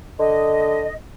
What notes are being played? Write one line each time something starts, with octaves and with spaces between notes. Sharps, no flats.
D3 D#5